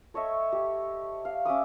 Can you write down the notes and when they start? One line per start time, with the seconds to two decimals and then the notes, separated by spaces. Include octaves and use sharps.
0.14 A4 C#5 D#5 E5
0.52 G4
1.25 F5
1.45 C#4 E5 D6 D#6